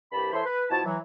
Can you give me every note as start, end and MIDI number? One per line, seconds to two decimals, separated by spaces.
0.12 0.32 36
0.12 0.32 43
0.12 0.32 67
0.12 0.32 81
0.12 0.32 83
0.33 0.41 52
0.33 0.41 69
0.33 0.41 72
0.33 0.41 73
0.33 0.41 76
0.33 0.41 84
0.45 0.64 71
0.70 0.80 47
0.70 0.80 53
0.70 0.80 64
0.70 0.80 66
0.70 0.80 81
0.85 0.97 52
0.85 0.97 54